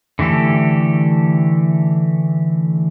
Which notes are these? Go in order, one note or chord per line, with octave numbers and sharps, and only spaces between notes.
D3 E3 A3 G4 A4